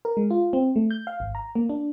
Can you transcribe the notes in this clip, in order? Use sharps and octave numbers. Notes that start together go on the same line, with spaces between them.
A#4
G#3
F4
C4
A3
G6
F5
G#1
A#5
A#3
D4